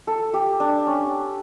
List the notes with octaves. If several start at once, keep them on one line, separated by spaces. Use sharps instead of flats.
A4
G4
D4
C#4